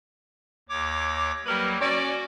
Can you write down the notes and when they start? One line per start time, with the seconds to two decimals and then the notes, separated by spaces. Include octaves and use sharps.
0.69 D#2 C#5 D6
1.46 F#3 G3 A#3 G4 A#4 B4
1.81 C#4 F#4 D5